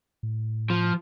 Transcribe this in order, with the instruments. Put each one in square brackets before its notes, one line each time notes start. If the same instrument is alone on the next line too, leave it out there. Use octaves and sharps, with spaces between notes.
[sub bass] A2
[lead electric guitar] F3